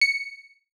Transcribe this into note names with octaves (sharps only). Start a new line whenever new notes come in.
C#7